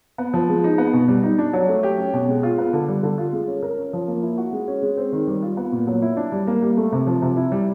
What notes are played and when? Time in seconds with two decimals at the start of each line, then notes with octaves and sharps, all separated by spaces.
0.18 B3
0.34 F3
0.49 G#3
0.64 D#4
0.78 B3
0.93 B2
1.08 G3
1.23 D#4
1.38 D4
1.53 F#3
1.68 A3
1.83 G4
1.98 C#4
2.13 B2
2.28 G#3
2.43 F4
2.58 B3
2.73 D3
2.88 G3
3.03 D3
3.18 F4
3.33 G#3
3.48 C#4
3.62 A#4
3.77 C#4
3.93 F3
4.07 A#3
4.23 E4
4.38 F#4
4.53 G#3
4.68 C#4
4.83 G#3
4.97 C4
5.12 D#3
5.27 G3
5.42 F4
5.57 B3
5.72 A#2
5.87 F#3
6.02 E4
6.17 D4
6.32 G3
6.47 A#3
6.62 G3
6.77 A3
6.92 C3
7.07 F3
7.22 C3
7.37 E4
7.52 G3